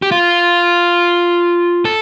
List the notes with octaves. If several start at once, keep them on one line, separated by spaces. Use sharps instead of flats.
G4
F4
A4